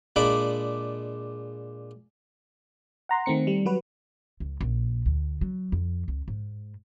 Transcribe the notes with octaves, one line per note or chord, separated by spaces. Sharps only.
A#2 G#3 D4 D5 B5 D6
F#5 A#5 C6
D#3 A3 C4 C#7
G3
F#3 F#4 B4
C#2
A#1
D2
F#3
F2
C#2
G#2